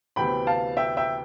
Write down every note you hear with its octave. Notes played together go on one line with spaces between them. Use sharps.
D2 C3 E3 B3 G5 B5
F5 A5
E5 G5
E5 G5